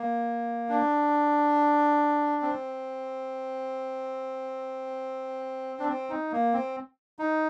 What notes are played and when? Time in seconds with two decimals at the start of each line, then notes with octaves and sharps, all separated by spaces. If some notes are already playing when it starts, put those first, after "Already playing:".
Already playing: A#3
0.69 D4
2.42 C4
5.80 D4
5.89 C4
6.10 D#4
6.32 A#3
6.53 C4
7.19 D#4